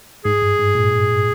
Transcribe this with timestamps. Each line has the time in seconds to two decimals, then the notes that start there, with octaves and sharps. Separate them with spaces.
0.25 G#2 G#4
0.42 G2
0.59 G#2
0.75 A#2